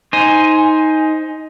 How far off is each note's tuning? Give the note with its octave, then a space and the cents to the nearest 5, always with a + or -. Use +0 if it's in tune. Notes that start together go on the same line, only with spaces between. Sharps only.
D#4 +15 C5 +0 G#5 +0